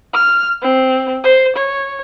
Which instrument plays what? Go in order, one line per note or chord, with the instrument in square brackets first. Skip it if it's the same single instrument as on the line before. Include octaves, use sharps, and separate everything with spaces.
[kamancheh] F6
C4
C5
C#5